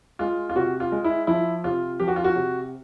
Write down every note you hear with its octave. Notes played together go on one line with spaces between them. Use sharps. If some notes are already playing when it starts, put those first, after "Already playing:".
G#3 F4
F4
C3 F#4
F4
G#3
E4
F3 E4
C3 F4
F3 G4
F#4
F4
F#4
C3